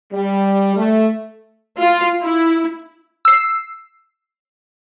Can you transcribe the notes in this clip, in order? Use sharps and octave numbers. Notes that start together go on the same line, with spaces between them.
G3
A3
F4
E4
E6 C7